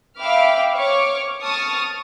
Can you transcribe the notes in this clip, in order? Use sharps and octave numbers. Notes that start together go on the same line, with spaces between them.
E5 F5 G5 B5 D6 F6
C#5 C#6 D6 F6
A5 C#6 D#6 F6 A6